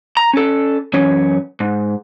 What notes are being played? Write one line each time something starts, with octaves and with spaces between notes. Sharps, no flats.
A#5
C#4 A4
F#2 E3 C#4 C#5
G#2